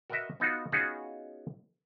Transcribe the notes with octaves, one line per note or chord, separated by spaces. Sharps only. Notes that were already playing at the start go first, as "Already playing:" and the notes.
F#4 A#4 B4 D#5 E5
B3 D#4 F4 F#4
B3 C#4 D#4 F4 F#4 G#4